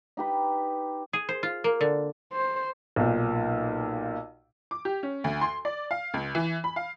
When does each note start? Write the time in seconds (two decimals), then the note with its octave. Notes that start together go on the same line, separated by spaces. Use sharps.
0.17 D#4 G4 B4
1.13 G#4
1.29 C5
1.43 F4
1.64 A#3
1.81 D3
2.33 C5
2.96 B1 A#2
4.71 D6
4.85 G4
5.03 C#4
5.24 D2
5.41 C6
5.65 D5
5.91 F5
6.14 C#2
6.35 E3
6.64 B5
6.76 F5